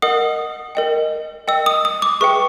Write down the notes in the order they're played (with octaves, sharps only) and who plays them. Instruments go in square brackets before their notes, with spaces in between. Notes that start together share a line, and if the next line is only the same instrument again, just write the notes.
[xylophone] A#4 D#5 F#5 D#6
A#4 D#5 G5
A#4 D#5 G5 E6
D#6
D#6
D6
G#4 B4 E5 G5 C#6